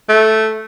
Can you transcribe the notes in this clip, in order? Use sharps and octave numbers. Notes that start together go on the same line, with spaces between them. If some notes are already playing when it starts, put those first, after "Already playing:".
A3